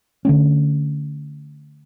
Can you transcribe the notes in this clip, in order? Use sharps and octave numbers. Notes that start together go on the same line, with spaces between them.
D3 A3 C#4